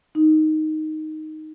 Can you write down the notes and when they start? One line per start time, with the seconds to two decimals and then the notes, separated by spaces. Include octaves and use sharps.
0.15 D#4